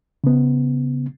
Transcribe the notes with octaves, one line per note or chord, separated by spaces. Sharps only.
C#3 B3